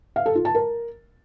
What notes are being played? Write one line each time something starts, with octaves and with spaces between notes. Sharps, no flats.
F5
A4
F4
A5
A#4